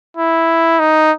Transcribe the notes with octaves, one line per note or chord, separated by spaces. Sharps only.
E4
D#4